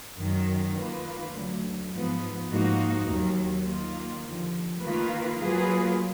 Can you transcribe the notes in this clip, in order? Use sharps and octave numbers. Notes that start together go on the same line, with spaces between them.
F#2 D#3 F#3
D#3 A#3 F4 B4
D2 D3 F#3
G#2 F3 B3
G#2 F3 A#3 D#4 F#4
D#2 D#3 F#3
D#3 A#3 F4
D#2 D3 F3
D#3 A#3 F4 B4
F#3 A#3 F4 G#4 B4